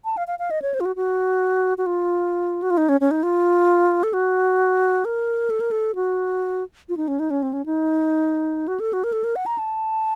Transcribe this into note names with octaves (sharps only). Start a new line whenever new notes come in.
A5
F5
F5
F5
D#5
C#5
C5
F4
F#4
F#4
F#4
F4
F#4
F4
D#4
C#4
C#4
D#4
F4
A4
F#4
A#4
A4
A#4
A4
F#4
F4
D#4
C#4
D#4
C#4
C4
C#4
D#4
F#4
A4
F#4
A#4
A4
A#4
F#5
A#5
A5